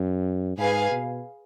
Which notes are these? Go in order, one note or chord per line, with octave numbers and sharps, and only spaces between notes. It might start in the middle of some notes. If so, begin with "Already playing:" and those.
Already playing: F#2
G#2 G#4 B4 F5 G#5
B2